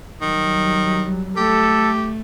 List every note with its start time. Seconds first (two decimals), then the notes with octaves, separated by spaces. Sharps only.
0.22 D#3 F#3 G3
1.37 A3 G4 A4